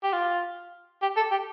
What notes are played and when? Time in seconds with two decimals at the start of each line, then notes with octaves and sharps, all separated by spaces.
0.04 G4
0.13 F4
1.02 G4
1.16 A4
1.31 G4